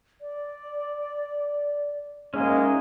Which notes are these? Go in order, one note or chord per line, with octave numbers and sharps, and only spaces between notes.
D5
G#2 G#3 A#3 C#4 E4 D#5